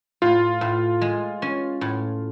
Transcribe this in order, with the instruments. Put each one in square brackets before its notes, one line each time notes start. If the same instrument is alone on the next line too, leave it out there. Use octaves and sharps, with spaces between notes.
[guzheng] A2 [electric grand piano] F4
[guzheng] A2
G#3
C#4
A2